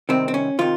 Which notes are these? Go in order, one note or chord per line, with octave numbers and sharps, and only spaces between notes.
C2 C3 D#3 C4
C4
C#4
C3 D#3 F3 F4